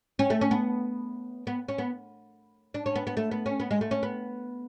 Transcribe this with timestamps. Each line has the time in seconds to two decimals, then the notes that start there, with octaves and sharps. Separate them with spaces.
0.19 C#4
0.30 A3
0.41 C#4
0.51 B3
1.47 B3
1.68 C#4
1.78 B3
2.74 D4
2.86 C#4
2.96 B3
3.07 B3
3.17 A3
3.31 B3
3.46 C#4
3.60 B3
3.71 G#3
3.81 A3
3.91 C#4
4.03 B3